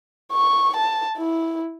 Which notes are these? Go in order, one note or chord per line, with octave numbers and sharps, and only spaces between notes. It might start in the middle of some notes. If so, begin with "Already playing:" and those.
C#6
A5
E4